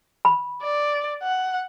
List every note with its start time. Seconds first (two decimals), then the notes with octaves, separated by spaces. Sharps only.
0.25 B5
0.62 D5
1.23 F#5